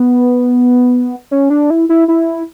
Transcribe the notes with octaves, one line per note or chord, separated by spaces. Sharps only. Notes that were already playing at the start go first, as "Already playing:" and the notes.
Already playing: B3
C#4
D4
E4
E4
E4